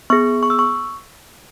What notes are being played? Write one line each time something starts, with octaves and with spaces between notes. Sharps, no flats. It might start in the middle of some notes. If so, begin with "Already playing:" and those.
B3 G#4 C#6
C#6
E6
C#6